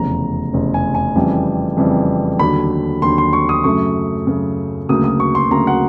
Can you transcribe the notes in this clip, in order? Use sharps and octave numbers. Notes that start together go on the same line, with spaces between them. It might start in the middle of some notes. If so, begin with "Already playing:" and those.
Already playing: F1 E2 C#3 A#5
F1 E2 C#3
G#5
G#5
F2 C#3 E3 G3
F2 C#3 E3 G3
D#2 D3 F#3 B5
D#2 D3 F#3 C6
C6
C#6
D#6
F#2 C#3 F#3 A3 C#6
F#2 C#3 F#3 A3
D2 C#3 F#3 A#3 D#6
D#6
C#6
C6
D2 C#3 F#3 A#3 A#5
F#5